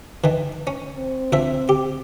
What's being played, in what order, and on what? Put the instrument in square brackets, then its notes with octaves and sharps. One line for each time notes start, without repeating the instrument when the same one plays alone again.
[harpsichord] D#3 E3
C#4
[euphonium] C4
[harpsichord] A#1 F3 E5
G4